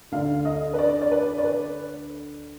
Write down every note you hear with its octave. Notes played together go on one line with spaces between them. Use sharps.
D2 D3 F5
D#5
B4
D5
D5
B4
D5
B4